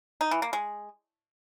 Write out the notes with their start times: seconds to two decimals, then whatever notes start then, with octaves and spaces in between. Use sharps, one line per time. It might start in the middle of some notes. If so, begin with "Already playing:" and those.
0.21 D#4
0.31 E3
0.42 A#3
0.53 G#3